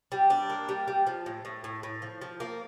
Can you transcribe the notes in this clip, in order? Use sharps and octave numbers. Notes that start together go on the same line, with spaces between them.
G3
D4
A#3
G3
G3
F3
A2
A2
A2
A2
F3
F3
A#3